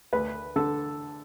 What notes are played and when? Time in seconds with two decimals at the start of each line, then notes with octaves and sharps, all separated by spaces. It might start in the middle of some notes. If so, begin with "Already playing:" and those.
0.13 D2 B4
0.56 D3 A4